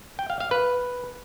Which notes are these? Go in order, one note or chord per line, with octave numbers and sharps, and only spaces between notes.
G5
F5
F5
B4